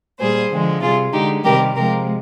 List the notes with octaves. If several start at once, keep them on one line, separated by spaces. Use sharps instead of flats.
A#2 G3 G#4 C5
D3 F3 G#3
C3 G3 F4 G#4
D3 G#3 D#4 G4
C3 D#3 G3 G4 A#4
C3 F3 G#3 G4 A#4